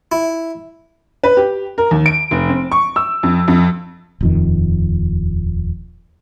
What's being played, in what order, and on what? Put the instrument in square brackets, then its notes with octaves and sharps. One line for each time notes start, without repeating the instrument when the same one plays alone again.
[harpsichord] E4
[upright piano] B4
G4
A#4
D#2
D7
F1
C4
C#6
E6
F2
F2
[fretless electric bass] D#1 F2 D#3